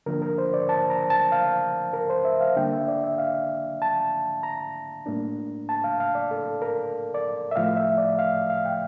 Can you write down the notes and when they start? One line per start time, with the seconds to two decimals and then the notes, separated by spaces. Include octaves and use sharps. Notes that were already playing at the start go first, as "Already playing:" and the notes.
0.06 D3 F3 A#3 D4 A#4
0.22 A#4
0.38 C5
0.54 D5
0.69 A5
0.90 A#5
1.10 A5
1.32 F5
1.93 A#4
2.10 C5
2.25 E5
2.41 F5
2.56 D3 G3 A#3 D4 G5
2.73 E5
2.88 D5
3.03 E5
3.18 F5
3.82 A5
4.43 A#5
5.06 A2 G3 A#3 D4
5.69 A5
5.84 F5
6.00 F5
6.15 D5
6.31 A4
6.62 A#4
7.14 D5
7.51 E5
7.56 A2 F3 A3 F5
7.76 E5
7.98 D5
8.19 F5
8.50 F5
8.65 G5